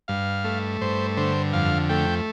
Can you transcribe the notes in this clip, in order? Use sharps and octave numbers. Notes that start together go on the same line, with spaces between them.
G2 F5
A3
G2 C5
D3 C5
F2 F5
A3 G5